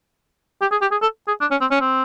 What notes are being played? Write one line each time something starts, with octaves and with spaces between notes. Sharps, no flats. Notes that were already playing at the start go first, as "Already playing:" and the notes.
G4
G#4
G4
G#4
A4
G#4
D4
C#4
C4
C#4
C4